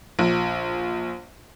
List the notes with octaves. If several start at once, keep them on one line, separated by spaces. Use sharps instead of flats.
A#1